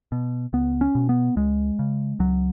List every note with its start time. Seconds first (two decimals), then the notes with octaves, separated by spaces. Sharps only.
0.12 B2
0.53 C#2 B3
0.81 C#4
0.95 B2
1.09 B3
1.36 C#2 G#3
1.79 C#3
2.19 C#2 F#3